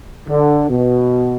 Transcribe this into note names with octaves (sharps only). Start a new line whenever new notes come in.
D3
B2